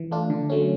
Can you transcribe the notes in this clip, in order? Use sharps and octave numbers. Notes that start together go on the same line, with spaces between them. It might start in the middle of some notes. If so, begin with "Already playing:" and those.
Already playing: E3
A3 D4 F4
D3
F#3 A3 C#4